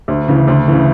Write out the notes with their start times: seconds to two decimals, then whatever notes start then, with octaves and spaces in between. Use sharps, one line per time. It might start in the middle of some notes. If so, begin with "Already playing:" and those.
0.08 D2
0.28 C#3 E3
0.48 D2
0.68 C#3 E3